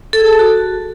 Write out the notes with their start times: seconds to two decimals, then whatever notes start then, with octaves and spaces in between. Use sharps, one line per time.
0.13 A4
0.20 G#4
0.26 A5
0.33 A4
0.39 F#4